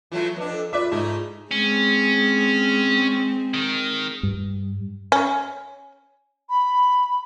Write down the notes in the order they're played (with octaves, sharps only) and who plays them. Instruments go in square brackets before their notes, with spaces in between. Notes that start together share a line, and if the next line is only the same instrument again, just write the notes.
[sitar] E3 F#3 A3 [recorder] F4
[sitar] F2 D4 [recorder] B4
[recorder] A4
[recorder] F4 [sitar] B4 E5 [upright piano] D5 D6
[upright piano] G#2 [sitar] A3 D#4 E4
[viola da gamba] G#3 C4 [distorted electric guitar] C#4
[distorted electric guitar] D#3
[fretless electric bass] G2
[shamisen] C#4
[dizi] B5